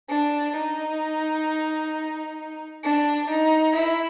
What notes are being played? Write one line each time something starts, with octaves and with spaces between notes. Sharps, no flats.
D4
D#4
D4
D#4
E4